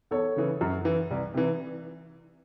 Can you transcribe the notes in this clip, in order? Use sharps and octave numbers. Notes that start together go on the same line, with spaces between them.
E2 A4 C#5
C#3 E3
F#2
E3
C2
C3 E3